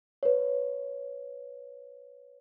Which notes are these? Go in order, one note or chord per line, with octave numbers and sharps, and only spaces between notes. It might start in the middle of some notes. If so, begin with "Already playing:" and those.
B4 C#5